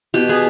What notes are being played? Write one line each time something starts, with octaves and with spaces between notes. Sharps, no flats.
B2 G4
B3 G#4